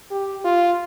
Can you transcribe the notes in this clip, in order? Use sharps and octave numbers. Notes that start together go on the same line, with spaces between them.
G4
F4